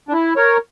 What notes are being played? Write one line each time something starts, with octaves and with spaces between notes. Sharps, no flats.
D4
E4
A#4 C#5